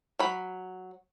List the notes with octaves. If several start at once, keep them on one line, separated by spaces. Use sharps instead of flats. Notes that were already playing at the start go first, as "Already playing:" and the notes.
F#3 B5